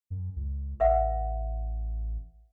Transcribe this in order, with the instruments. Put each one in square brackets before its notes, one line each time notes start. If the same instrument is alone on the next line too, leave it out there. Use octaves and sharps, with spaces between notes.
[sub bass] F#2
C#2
[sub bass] A1 [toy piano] B4 E5 F#5